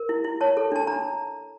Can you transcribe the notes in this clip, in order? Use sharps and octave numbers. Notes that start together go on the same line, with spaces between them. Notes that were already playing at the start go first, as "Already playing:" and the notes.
Already playing: A#4
E4
E4
C#5 A5
A4
D4 A5
D4 A#5